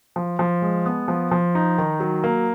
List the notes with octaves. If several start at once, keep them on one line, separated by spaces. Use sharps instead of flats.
F3
F3
G#3
B3
F3
F3
D#4
D#3
F#3
A#3